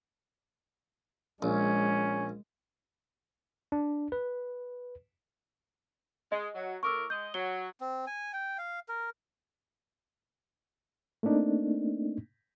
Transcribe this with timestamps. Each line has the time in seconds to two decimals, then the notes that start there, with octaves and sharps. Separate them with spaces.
1.42 A#1 G#3 C#4
3.72 D4
4.12 B4
6.32 G#3 D#5
6.55 F#3
6.83 A2 A#4 C#6 D6 E6
7.10 G#3 D#5 G6
7.34 F#3 G7
7.81 C4
8.07 G#5
8.33 G5
8.58 F5
8.88 A#4
11.23 A3 A#3 C4 D4 D#4